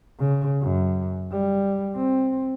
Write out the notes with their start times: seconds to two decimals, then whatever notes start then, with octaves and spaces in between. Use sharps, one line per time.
0.19 C#3
0.61 F#2
1.31 G3
1.95 C4